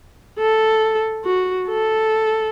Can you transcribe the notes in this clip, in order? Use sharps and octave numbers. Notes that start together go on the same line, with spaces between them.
A4
F#4
A4